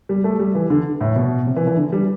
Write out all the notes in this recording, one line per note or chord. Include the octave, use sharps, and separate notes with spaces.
G3
A3
G3
E3
D3
A2
B2
C3
E3
E3
D3
G3